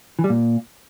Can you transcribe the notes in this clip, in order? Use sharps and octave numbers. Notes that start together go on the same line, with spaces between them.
E3
G3
A#2